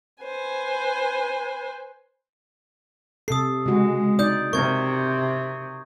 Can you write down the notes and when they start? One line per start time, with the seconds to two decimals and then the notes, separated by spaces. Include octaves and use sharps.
0.23 B4 C5 G#5
3.28 C3 A4 D#6 C7
3.66 C#3 G#3 F#4
4.19 D#4 D5 D#6 G6
4.53 C3 A#4 C#6 G#6